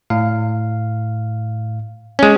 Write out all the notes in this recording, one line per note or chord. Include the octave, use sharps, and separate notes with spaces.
A2 F5
G#3 C#4